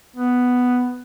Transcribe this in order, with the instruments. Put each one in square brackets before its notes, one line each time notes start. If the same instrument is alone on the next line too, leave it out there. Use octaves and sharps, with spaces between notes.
[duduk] B3